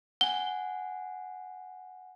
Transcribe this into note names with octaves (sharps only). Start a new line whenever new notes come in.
F#5 G#5 G7